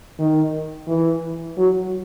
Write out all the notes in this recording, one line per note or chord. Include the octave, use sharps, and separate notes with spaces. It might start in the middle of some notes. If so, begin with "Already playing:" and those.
D#3
E3
F#3